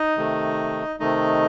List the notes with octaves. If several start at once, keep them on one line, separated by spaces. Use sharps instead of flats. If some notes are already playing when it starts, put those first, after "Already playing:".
Already playing: D#4 D#5
C3 D#3 A3
C3 D#3 A3 D#4 D#5